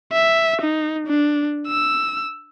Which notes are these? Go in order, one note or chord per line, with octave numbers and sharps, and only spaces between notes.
E5
D#4
D4
E6